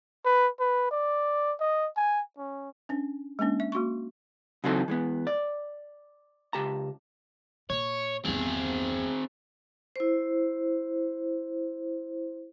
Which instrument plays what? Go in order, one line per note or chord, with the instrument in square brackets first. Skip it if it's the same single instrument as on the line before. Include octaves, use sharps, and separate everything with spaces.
[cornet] B4
B4
D5
D#5
G#5
C#4
[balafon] C#4 D4
G#3 A#3 C#4 D4
E5
A#3 F#4 C6 C#6
[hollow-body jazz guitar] C#3 E3 F#3 C4 D#4 A4
E3 G#3 B3
D5
C#2 G4 A5 A#5
[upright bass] A#2 [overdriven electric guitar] C#5
[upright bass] G1 E2 [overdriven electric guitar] C4 G#4
[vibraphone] E4 C5